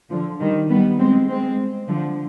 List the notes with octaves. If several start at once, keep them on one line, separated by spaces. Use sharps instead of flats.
D3 F3
D#3 G3
G3 B3
G#3 C4
G#3 C4
D3 F3